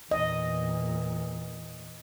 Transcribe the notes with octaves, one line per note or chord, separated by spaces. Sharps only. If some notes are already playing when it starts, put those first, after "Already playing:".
E2 A#2 D#5